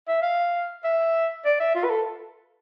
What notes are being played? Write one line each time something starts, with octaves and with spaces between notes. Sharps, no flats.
E5
F5
E5
D5
E5
F4
B4
A4